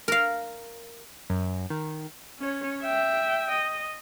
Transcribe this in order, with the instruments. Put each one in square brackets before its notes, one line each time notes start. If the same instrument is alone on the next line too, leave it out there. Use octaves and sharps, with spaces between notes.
[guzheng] A#4 F5
[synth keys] F#2
D#3
[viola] C#4 C#5
E5 G5
D#5